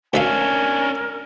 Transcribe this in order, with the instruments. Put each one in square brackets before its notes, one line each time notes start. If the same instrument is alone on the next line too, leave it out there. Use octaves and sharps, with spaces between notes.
[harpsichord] D2 E5 F5 [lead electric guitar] C#4 D4 [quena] A#4 [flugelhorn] G#5